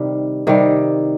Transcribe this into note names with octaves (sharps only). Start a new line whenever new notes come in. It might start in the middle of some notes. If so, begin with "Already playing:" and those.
Already playing: C3 D#3 G3
C3 D#3 G3